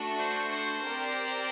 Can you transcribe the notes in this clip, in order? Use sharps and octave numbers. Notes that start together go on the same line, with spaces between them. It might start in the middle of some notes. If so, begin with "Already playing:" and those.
Already playing: A3 D4 F#4
C5
C5
C4 G4 A#4 D5